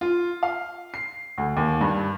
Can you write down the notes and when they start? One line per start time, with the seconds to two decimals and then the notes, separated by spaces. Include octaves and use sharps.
0.01 F4
0.43 F5
0.94 C7
1.38 D2
1.57 D#2
1.81 G2